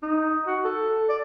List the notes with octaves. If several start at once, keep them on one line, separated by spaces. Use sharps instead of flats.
D#4
F#4
A4
D5